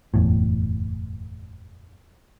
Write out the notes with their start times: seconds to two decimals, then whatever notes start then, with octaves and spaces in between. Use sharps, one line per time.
0.14 F#1 E2 A2